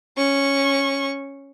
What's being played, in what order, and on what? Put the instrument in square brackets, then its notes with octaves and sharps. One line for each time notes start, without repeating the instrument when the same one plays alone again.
[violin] C#4 C#6